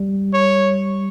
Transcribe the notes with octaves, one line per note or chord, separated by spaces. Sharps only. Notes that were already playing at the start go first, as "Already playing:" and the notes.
Already playing: G3
C#5